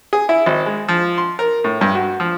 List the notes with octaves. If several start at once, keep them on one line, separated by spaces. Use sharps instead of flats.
G#4
E4
G#1
G#3
F3
C6
A#4
A2
G2
F#4
F3